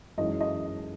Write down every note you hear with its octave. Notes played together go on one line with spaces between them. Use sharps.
F#2 E3 G#3 D#4 D#5
D#5